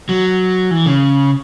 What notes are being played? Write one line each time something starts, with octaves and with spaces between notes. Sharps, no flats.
F#3
E3
C#3